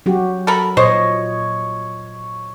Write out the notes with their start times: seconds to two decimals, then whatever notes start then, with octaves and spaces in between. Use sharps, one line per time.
0.06 F#3 F#4 G4
0.47 A4 A#4 B5
0.77 A#2 C5 C#5 D#5